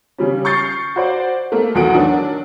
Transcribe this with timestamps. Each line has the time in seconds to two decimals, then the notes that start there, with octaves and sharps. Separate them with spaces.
0.18 C#3 G3 C#4
0.45 C#6 F6 G6 A6 C7 C#7
0.96 F#4 C5 D5
1.52 A3 A#3
1.75 B1 E2 A3 F#4 F#5 D7
1.94 D#3 F#3 D4